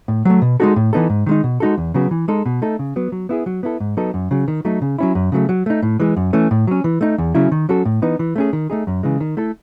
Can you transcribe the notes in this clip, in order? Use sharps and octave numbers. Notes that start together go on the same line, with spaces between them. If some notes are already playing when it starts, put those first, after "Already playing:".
A2
F#3 A3
B2
G#3 D#4 F#4 A4
A2
E3 B3 D#4 A4
G#2
D#3 G#3 D#4
B2
G#3 D#4 F#4 A4
E2
C#3 F#3 B3 F#4
E3
G#3 D#4 A4
B2
A3 D#4 A4
C#3
F#3 B3
F#3
B3 E4 G#4
F#3
B3 E4 A4
G#2
F#3 B3 D#4 A4
F#2
C#3 F#3
D#3
F#3 A3 D#4
C#3
F#3 C#4 E4
F#2
C#3 F#3 A3
F#3
A3 D#4
A2
E3 G#3
F#2
E3 A3 C#4
A2
F#3 C#4
E3
A3 D#4
E2
C#3 F#3 C#4 E4
D#3
F#3 C#4 F#4 A4
A2
E3 B3 D#4
E3
A3 C#4 G#4
D#3
A3 D#4 G#4
F#2
C#3 E3 G#3
D#3
A3 E4 A4